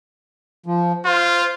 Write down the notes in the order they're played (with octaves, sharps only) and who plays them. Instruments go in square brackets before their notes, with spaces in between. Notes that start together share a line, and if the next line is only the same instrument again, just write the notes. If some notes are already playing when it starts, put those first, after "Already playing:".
[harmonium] F3
[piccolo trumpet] F4 [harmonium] C5